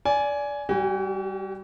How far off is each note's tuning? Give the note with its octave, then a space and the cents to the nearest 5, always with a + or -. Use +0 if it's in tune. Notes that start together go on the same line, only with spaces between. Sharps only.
D5 -20 G#5 +10
G3 +0 F#4 +45 G#5 -35